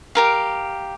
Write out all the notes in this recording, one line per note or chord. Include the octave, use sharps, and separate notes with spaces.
G4 A#4 F5